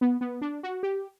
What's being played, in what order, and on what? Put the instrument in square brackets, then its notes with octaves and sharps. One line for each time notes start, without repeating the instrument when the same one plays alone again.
[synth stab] B3
B3
D4
F#4
G4